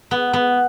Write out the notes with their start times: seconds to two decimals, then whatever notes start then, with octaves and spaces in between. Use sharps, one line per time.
0.11 B3
0.33 B3